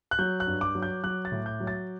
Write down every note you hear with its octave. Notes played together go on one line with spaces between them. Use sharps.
F#6
F#3 G6
F#6
G2
D6
F#3
G6
F#3 F#6
A6
A2
G6
F#3
A6